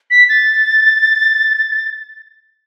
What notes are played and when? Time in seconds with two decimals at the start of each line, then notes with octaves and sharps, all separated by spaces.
0.11 B6
0.29 A6